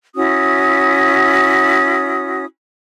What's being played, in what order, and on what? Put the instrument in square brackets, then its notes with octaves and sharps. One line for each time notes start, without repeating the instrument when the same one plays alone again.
[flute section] C#4 E4 F#4 D#6